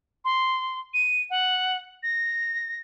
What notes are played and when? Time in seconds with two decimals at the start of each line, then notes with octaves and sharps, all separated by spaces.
0.25 C6
0.94 D#7
1.30 F#5
2.03 A#6